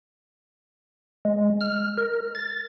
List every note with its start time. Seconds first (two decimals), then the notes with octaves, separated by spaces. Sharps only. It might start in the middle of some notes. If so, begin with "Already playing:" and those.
1.25 G#3
1.61 F6
1.98 A#4
2.35 A6